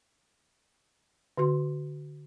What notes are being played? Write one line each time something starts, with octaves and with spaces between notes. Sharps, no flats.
D3 F#4 C6